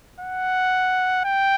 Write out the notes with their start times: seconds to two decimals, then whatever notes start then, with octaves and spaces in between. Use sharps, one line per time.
0.20 F#5
1.25 G5